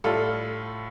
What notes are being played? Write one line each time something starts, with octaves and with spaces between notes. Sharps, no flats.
A2 G3 F4 A4